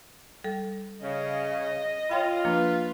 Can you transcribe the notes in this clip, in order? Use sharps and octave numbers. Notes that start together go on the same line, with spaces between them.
G3 A4
C#3 D#5
F4 C#5 G5 B5
F3 A#3 D4 B4